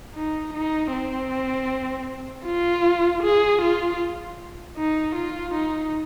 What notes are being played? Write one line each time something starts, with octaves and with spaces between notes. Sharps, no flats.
D#4
D#4
C4
F4
G#4
F4
D#4
F4
D#4